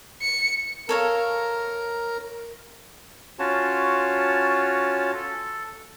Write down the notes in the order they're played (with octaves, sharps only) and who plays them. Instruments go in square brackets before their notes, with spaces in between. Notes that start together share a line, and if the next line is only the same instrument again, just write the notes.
[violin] C#7
[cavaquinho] A4 C#5 F5 [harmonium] A#4 A#5
[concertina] C#4 F4 F#4 C#5 A5
A4